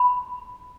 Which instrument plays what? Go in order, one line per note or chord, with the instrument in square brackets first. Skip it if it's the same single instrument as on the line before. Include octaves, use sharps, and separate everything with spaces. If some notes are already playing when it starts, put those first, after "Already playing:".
Already playing: [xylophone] B5